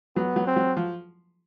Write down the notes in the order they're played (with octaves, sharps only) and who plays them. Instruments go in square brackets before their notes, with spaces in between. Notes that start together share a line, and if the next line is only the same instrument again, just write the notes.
[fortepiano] F#3 [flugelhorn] B3
[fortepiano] F#3
[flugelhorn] C4
[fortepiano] F#3
F3